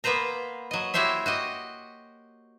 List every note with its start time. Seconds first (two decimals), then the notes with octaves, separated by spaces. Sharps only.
0.04 A#3 B3 B4 C5 A#5
0.71 F#3 D#5
0.94 E4 F#4 G4 C5 C#5 E5
1.26 F#4 G4 D#5